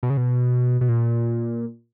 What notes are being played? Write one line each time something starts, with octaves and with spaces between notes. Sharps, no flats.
B2
C#3
B2
B2
A#2